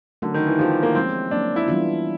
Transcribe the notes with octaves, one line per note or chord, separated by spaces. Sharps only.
D3 F#3 A3 C#4 F#4 A#4
D#3
E3
F3 B3 E4 G4
A#3
F3 G#3 C4 C#4
F#3 A#3 C#4 D4
E4
E3 G3 B3 D4 F4